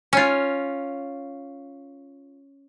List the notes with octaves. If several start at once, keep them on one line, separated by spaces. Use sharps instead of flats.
C#4 F4